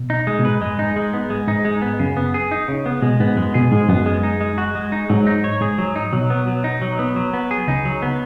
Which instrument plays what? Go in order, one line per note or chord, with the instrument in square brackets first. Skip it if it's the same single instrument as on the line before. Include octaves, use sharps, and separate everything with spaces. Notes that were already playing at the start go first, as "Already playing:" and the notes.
Already playing: [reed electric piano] B2
[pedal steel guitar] D#4
G#3
[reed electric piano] B2
[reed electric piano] G#2 [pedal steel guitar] B4
[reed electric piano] F#2 [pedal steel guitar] G#3
[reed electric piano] G#2 [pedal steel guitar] D#4
[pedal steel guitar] G#3
B3
G#3
[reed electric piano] G#2 [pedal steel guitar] D#4
[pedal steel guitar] G#3
B3
[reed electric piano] F#2 [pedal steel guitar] C#3
[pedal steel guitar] B3
G#4
D#4
C#3
B3
[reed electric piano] B2 [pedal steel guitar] G#3
[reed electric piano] G#2 [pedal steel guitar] B3
[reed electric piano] F#2 [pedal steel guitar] G#3
[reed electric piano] B2 [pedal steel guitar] G#4
[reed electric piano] G#2 [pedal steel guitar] G#3
[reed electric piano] F#2 [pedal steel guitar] B3
[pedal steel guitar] G#3
D#4
G#3
F#4
G#3
D#4
[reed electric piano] G#2 [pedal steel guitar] F#3
[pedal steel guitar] D#4
C#5
[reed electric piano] G#2 [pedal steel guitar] G#4
[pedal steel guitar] F#3
D#4
[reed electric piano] B2 [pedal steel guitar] F#3
[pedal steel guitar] B3
F#3
D#4
F#3
B3
F#3
B3
G#4
[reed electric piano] C#2 C#3 [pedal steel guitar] D#4
[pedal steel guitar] F#3
B3